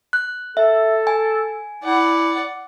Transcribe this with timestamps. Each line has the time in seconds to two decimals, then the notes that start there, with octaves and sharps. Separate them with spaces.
0.13 F#6
0.57 A4 E5
1.07 G#5
1.84 E4 D5 F#5